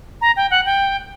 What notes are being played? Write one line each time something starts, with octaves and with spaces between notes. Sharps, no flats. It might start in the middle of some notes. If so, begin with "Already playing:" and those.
A#5
G5
F#5
G5